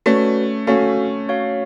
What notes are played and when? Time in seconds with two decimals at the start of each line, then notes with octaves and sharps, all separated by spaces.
0.06 A3 C#4 F#4 B4 D5
0.67 A3 C#4 F#4 A4 F5 G#5
1.28 F#4 C#5 F5